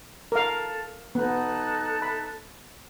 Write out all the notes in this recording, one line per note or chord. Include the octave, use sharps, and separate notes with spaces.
A4 A#4 F5
B3 D#4 A4 F#6
B5